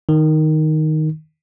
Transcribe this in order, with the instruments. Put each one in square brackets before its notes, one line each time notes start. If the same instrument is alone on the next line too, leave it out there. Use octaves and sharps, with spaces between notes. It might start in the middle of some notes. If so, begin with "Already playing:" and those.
[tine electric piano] D#3